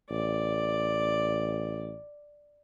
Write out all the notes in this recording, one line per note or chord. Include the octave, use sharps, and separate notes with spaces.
A1 D5